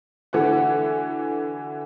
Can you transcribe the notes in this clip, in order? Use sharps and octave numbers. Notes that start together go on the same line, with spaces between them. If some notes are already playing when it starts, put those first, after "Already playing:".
D3 E3 F#4 F#5